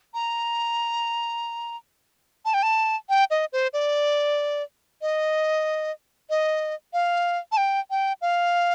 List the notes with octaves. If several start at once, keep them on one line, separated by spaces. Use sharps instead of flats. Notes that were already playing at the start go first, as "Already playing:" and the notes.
A#5
A5
G5
A5
G5
D#5
C5
D5
D#5
D#5
F5
A5
G5
G5
F5